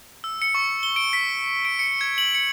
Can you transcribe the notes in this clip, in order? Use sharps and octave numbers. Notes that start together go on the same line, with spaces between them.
E6
C#7
C#6
G7
D7
B6
D7
C#7
G#6
F#7
C#7